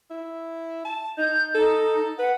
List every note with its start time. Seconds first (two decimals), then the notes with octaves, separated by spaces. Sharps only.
0.10 E4
0.85 A5
1.18 D#4 G6
1.55 D#4 A4
2.19 B4 F#5